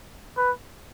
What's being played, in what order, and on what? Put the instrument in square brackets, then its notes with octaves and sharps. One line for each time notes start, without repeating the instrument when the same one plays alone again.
[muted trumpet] B4